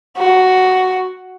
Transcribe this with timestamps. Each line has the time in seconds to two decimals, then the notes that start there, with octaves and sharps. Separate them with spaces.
0.17 F#4